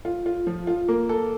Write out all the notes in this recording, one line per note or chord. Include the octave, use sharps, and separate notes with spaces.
F4
F4
F3
F4
A#3
A4